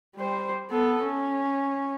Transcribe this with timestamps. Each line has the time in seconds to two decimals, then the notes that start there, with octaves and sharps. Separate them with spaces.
0.15 G3 C5
0.70 B3 A4
1.04 C#4